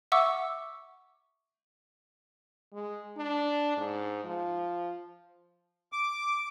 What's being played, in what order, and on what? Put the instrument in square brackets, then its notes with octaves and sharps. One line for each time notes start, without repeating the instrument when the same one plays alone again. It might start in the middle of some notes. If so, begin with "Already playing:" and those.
[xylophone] E5 F#5 C#6 D6 E6
[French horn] G#3
D4
G#2
F3
[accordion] D6